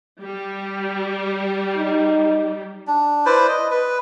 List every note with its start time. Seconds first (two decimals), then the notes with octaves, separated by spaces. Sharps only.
0.21 G3
1.78 D#4
2.87 D4
3.26 E4 B4 C5 D5
3.49 D#5
3.71 B4